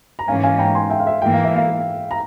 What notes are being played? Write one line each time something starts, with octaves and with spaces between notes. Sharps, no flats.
A#5
G#2 E3 A#3 C#4 F5 G#5
F5 G#5
G5 A#5
G#5 C6
E5 G5
F5
E5
G#2 E3 A#3 G5
F5
E5
F5
A#5